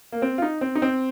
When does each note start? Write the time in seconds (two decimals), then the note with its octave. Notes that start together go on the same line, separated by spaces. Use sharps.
0.12 A#3
0.22 C4
0.38 F4
0.42 D#4
0.61 C4
0.75 D#4
0.82 C4